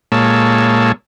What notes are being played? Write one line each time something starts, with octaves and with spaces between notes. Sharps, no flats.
A#2 G#3 A#3 C#5 A5 E6